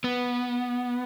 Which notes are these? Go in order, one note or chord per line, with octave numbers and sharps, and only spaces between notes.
B3